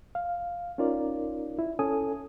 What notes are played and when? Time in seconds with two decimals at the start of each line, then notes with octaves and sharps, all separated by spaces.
0.15 F5
0.78 C#4 D#4 F4 A#4 D5
1.59 E4
1.79 C#4 A4 G#5 D#6